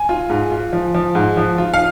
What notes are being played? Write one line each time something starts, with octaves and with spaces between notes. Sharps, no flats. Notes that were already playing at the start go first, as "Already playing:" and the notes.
Already playing: G#5
F4
G#2
F4
F3
F3
G#2
F3
F4
F5